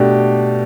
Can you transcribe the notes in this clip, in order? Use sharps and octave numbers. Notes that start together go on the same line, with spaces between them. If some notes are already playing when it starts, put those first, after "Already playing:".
Already playing: B2 A3 D4 G4